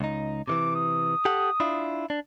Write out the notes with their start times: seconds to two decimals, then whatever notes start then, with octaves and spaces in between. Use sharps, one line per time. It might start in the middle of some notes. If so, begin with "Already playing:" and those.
0.01 C#2 D#4
0.48 C3 D#3 E3 D6
0.75 D#6
1.25 G4 A4 F#5
1.60 D4 E4 F4
2.10 D4